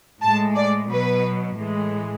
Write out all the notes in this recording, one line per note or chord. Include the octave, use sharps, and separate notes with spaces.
A2 G#3 A5
D5
B2 F#3 B4
A2 E3 G#3